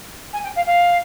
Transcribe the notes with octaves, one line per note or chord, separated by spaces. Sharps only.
G#5
G5
F5
F5